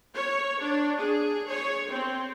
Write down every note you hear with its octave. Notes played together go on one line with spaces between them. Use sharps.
C#5
D4
G#4
C#5
C4